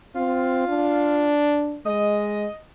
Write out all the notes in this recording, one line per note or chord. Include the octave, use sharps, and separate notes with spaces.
C4 F4
D4
G#3 D#5